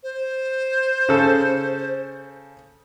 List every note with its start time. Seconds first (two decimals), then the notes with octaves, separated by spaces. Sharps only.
0.03 C5
1.09 C#3 A4